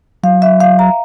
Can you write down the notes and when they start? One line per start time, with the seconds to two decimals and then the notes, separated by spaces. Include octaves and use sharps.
0.23 F#3 F5
0.42 E5
0.60 F5
0.79 A#5